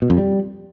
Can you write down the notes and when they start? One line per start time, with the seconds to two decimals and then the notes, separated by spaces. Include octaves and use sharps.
0.02 B2
0.10 F2
0.18 G3